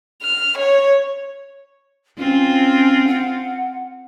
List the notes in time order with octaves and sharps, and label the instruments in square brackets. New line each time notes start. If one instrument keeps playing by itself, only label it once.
[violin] F6
C#5
[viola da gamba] C4 F4 [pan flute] C#4
[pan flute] F#5